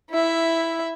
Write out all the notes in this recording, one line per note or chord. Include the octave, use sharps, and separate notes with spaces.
E4 E5